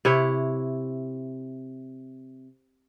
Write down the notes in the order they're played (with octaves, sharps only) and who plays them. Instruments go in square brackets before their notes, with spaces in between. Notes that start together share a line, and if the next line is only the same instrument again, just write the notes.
[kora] C3 E4 C#5